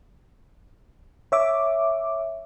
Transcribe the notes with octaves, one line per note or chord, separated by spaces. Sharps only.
C#5 E5 D6